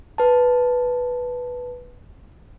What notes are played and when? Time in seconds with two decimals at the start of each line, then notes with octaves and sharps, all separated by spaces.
0.18 B4 A5